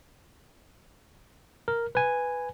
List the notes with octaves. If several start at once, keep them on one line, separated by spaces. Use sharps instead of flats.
A#4
B4 G#5